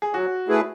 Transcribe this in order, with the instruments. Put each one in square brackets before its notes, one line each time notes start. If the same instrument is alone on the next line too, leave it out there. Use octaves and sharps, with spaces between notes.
[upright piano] G#4
[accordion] F#3 [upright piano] F#4
[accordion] A3 E4 G#4 B4